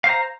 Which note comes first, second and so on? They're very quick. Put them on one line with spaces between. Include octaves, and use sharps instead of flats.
F5 C5 A#5